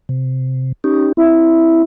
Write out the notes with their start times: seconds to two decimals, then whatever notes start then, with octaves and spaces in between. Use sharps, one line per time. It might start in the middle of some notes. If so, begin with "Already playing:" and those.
0.09 C3
0.84 C#4 D#4 G4
1.17 C4 E4